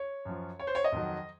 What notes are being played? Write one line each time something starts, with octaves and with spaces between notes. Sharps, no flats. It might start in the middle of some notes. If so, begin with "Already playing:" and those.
Already playing: C#5
F#2 F3
C#5
C5
C#5
D#5
F2 D#3 F#3